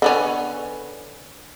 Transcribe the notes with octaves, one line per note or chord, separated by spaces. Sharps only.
D3 B3 C#4